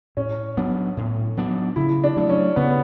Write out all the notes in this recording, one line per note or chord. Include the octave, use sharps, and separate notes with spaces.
A2 C#4
F#3 B3 D4
A2
F#3 B3 D4
C#3 E4
D4
F#3 A3 D4
C#4
C#3 B3